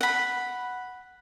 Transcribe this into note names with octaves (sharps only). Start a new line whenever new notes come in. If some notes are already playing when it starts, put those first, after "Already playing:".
F#5 B5